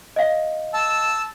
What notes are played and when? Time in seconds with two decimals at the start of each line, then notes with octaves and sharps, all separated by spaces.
0.16 D#5 F5
0.73 A5 E6